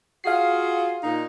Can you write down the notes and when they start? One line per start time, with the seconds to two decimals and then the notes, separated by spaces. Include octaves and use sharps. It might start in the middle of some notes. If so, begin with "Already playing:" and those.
0.24 F4 F#4 G#4 F5 C7
1.03 A#2 D#4